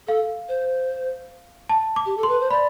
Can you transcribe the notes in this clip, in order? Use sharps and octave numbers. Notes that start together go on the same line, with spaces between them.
A4 F5
C5
A5
D6
G4
A4
C6
B4
C5
D5 B5